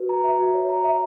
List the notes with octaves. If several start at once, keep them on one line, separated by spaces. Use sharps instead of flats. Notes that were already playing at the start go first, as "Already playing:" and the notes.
Already playing: F#4 B4
A#5
E5
F#4
C#5
A#5
E5